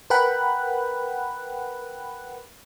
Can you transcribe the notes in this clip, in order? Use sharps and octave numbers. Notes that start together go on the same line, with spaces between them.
A#4 B4 F#5 G5 B5 F#6